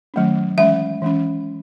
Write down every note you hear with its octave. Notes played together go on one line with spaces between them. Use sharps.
D#3 F#3 A3 C#4
E3 G#3 C#4 E5
E3 G#3 C#4